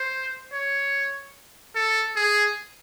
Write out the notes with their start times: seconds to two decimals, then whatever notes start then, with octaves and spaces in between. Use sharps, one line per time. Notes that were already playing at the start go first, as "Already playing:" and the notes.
Already playing: C5
0.53 C#5
1.75 A4
2.16 G#4